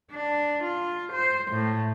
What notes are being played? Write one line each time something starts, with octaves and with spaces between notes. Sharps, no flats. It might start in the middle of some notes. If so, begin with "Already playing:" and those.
D4
F4
C5
A2